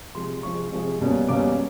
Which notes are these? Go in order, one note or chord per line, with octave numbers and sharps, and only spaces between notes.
C3 F3 G#3 C6
C3 F3 G#3 C#6
C3 F3 G#3
C#2 B2 G3 A#3 C#4
C#2 B2 G3 A#3 C#4 D6